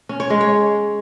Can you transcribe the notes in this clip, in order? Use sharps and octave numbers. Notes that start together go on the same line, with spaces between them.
C#4
C#5
G#3
C#5